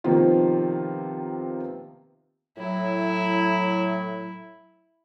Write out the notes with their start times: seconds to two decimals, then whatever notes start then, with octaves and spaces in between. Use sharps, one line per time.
0.04 C3 D#3 F3 A#3 B3 F4
2.58 A2 F#3 E4